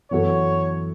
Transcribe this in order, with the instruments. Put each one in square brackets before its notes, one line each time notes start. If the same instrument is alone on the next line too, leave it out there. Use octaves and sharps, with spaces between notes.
[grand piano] F#2 E3 B3 F#4 A4 [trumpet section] C#5